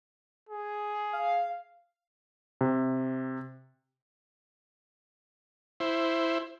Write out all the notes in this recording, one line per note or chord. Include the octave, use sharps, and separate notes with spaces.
G#4
F5
C3
E4 C5